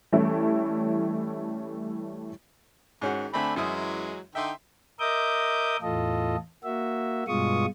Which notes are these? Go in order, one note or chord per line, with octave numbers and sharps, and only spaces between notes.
E3 G3 A3 C#4 E4 A4
G#2 D#3 C#4 F#4
D3 A3 C4 D4 G#5 B5
F#2 E3 F#3 G#3 E4 D#6
D3 D#4 E5 G5 C6
A#4 D#5 E5 D6 D#6 G6
E2 A2 F4 A4 D#5
A#3 F#4 E5
G2 B2 G#3 F4 C#6 D#6